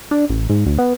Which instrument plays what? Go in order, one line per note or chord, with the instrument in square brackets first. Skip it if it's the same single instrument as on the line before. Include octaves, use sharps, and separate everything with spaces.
[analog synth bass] D4
A1
G#2
D2
B3